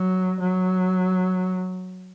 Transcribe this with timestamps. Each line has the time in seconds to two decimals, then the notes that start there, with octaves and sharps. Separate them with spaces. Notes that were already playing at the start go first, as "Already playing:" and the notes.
Already playing: F#3
0.40 F#3